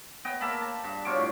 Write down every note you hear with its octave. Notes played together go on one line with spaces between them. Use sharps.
B3 D#5 G5
A#3 E5 A5 B5
A5
G2 A5
B2 F4 C#5 D6
A2